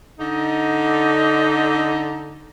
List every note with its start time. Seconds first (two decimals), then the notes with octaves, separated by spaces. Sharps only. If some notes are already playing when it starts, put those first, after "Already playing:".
0.20 D3 D#4